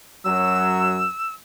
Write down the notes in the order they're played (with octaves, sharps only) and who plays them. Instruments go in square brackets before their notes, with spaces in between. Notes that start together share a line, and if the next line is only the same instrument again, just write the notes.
[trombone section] F#2 F#3 [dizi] E6